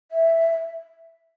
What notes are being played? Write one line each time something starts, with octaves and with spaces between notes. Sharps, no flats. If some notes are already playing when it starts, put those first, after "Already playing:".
E5